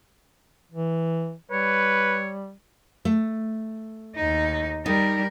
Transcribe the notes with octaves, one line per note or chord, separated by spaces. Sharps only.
E3
G3 B4 C#5
A3
D#2 D#4
G3 D#4 A#4